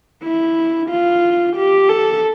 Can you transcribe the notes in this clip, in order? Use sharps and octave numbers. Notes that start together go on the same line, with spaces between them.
E4
F4
G4
A4